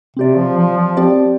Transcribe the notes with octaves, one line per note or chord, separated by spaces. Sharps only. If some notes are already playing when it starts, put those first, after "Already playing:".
C3 C4 G4 D5
F3
F3
F3
C4 G4 D5